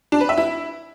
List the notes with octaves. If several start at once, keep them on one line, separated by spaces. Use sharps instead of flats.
D4
B4
E5
E4